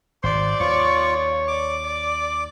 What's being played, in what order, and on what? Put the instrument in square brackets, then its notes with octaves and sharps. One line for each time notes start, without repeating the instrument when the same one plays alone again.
[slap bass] G#1 [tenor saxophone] C5 [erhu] D5
[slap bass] D#2 [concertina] F4 C#6 [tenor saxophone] C#5
[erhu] D5 [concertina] D6
[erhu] D5